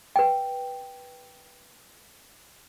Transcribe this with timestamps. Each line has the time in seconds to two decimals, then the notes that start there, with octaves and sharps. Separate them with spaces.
0.16 B4 G5